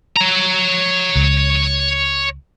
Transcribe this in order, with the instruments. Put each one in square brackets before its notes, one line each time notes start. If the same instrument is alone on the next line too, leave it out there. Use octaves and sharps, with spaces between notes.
[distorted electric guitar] C#5 A#5
[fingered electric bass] C#2